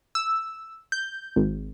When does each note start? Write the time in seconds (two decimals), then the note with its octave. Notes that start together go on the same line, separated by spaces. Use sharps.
0.15 E6
0.92 G6
1.36 G#1